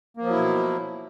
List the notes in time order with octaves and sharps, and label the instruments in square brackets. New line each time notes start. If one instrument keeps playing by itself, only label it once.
[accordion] A#3
F3
F#3
E4
B2